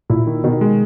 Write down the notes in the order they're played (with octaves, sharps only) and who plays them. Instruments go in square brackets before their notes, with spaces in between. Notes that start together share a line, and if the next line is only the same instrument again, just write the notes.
[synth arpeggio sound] A#2 [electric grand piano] E4
[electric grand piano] D#3
[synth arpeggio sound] B2 [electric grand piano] D#3
[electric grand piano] G#3